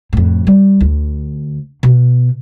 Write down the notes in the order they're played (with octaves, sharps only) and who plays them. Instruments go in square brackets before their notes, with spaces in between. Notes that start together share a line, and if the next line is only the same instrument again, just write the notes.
[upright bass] F2 A2
G3
D2
B2